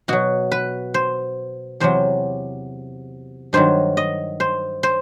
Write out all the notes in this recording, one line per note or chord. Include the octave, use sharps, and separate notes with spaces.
B2 F#3 F#4
B4
C5
E2 C3 F#3 C5
G2 D#3 F#3 C5
D#5
C5
C5